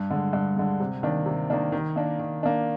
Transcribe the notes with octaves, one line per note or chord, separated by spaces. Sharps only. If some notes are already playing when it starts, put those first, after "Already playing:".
Already playing: G2
D3 G#3
G2
D3 G#3
C3
D#3 A#3 D4
C3
D#3 A#3 D4
D#3
A#3 D4
D#3
A#3 D4